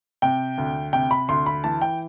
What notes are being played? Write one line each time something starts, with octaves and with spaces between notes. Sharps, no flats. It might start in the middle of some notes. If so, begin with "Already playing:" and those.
C3 G5
D2
C3 G5
B5
D2 C6
B5
E3 A5
G5